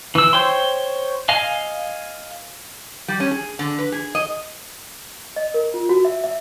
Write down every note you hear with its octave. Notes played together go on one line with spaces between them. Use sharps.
E3 E6
C5 C#5 G5 C6
D#5 F5 G#5
G3
C#4
G#4
D3
B4
G#4
D#5
D#5
A#4
F4
F#4
E5
E5